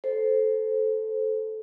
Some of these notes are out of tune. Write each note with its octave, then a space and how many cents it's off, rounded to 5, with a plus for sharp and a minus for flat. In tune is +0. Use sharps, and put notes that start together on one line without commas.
A4 -10 C5 +0